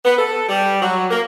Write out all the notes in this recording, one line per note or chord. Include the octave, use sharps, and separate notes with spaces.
B3
A4
G3
F#3
A#3